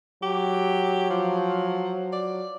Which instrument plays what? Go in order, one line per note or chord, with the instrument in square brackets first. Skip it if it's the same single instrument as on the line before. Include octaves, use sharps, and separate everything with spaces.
[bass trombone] F#3 [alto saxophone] G4
[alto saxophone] F3
D5